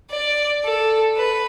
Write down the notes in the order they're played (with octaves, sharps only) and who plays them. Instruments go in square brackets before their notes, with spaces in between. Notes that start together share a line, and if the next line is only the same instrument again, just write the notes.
[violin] D5
A4
B4